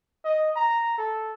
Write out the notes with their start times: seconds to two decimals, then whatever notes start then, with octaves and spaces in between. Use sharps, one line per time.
0.25 D#5
0.56 A#5
0.98 A4